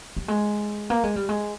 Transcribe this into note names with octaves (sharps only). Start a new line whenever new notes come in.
G3
G#3
A#3
G#3
G3
G#3